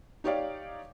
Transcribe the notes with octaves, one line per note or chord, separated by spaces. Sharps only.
D#4 G4 C#5 D5 F5